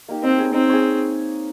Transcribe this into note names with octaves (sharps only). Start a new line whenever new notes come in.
A#3 D#4 G4
C4 D#4
G#4 C#5
C4 D#4
G#4 C#5